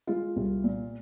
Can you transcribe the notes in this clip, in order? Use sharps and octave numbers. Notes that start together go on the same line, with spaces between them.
G#3 F4
C2
A#2